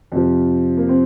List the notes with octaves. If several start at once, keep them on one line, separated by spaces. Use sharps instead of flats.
F2 C3 F3
A#3
C4